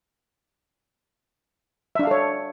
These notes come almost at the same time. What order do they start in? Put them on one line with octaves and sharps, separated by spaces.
E5 D4 F5 A4 C#5